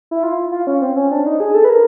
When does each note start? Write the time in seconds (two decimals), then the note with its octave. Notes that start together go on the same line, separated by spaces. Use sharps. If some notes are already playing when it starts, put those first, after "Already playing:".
0.11 E4
0.23 F4
0.52 F4
0.67 C#4
0.82 C4
0.96 C#4
1.11 D4
1.26 D#4
1.40 G#4
1.54 A4
1.64 B4
1.69 A#4